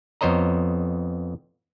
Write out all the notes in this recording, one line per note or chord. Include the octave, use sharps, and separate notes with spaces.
F2 B3 C5 C#5 D#5 A#5